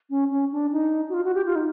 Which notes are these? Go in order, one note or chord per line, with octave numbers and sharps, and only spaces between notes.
C#4
C#4
D4
D#4
F#4
F4
F#4
G4
F4
D#4